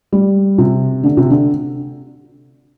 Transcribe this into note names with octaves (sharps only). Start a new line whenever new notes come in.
G3
C3
D3
C3
D3